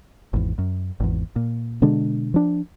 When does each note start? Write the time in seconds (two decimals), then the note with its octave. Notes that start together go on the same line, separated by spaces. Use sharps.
0.33 G#1 E2
0.58 F#2
1.00 G#1 E2
1.36 A#2
1.82 B2 D3 G#3 D4
2.34 F3 D4